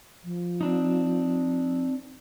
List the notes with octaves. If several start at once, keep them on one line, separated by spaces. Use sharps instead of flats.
F3
C4 D4 D#4